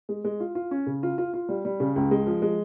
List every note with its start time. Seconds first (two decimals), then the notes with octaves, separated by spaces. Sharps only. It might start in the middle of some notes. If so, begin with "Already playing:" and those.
0.09 G#3
0.24 G#3
0.40 F4
0.55 F4
0.71 C#4
0.86 C#3
1.03 F4
1.18 F4
1.34 F4
1.49 G3
1.65 G3
1.80 C#3
1.96 C#2
2.11 G#3
2.27 F3
2.42 G#3